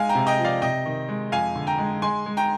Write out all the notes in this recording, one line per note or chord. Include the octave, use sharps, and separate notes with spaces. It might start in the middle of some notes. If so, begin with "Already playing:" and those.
Already playing: G#3 F5 G#5
G5 A#5
C3
D#5 G5
F3
D5 F5
C3 D#5 G5
D#3
G#3
F2 F5 G#5
D3
G5 A#5
G#3
G#3 G#5 C6
G#3
G5 A#5